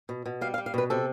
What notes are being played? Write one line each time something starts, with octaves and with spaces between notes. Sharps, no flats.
B2
B2
G3 F5
F5
G3
F5
B2 B4
C3 A4